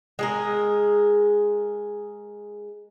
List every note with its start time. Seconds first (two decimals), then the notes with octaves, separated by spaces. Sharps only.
0.19 G#3 G#4 A#4